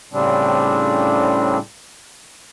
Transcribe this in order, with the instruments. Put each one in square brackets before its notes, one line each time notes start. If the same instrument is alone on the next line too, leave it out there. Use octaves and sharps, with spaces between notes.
[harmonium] A2 C#3 G3 C4 D4